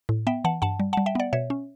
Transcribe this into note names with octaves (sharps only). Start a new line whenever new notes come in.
A2
B3 E5 G5
E3 F#5 A5
G2 F#5 A5
G3
G3 F#5 A5
E5 G5
B3 D5 F#5
B2 C#5 E5
C#4